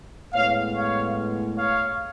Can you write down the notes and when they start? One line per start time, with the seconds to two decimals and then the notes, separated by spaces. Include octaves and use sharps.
0.34 A2 G#3 B3 C#5 F5
0.75 C#5 F5
1.57 C#5 F5